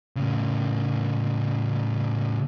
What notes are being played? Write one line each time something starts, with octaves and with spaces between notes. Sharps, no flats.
A2 C#3